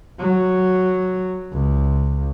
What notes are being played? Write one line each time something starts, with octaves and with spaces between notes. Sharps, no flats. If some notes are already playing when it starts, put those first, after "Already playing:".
F#3
C#2